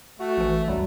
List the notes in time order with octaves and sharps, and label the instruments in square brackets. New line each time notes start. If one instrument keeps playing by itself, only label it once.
[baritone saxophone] A3 [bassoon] F#4
[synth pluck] A1 E3
[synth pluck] C2 F#2 G3 [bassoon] F#3